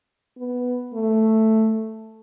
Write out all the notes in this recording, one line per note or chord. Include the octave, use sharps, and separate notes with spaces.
B3
A3